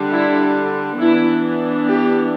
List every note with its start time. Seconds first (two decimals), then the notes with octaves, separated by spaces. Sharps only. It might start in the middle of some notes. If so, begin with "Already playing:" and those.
Already playing: D3 G3 D4
0.10 E4
0.98 E3 B3 D4 E4
1.87 G4